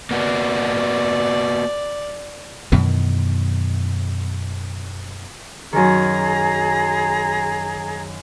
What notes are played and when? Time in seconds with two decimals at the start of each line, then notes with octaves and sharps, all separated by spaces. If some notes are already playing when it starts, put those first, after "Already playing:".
0.11 A#3 B3 F#4 D5
2.72 F#2 B2 D#3 E3
5.73 F#2 D#3 G#4 A#5